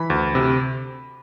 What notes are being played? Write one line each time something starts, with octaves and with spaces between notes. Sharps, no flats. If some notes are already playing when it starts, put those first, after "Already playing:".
Already playing: E3 B5
D2
C3